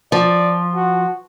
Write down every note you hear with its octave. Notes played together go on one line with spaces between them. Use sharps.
F3 D5
F#4